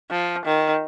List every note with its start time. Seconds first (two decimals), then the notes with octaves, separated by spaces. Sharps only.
0.11 F3
0.46 D#3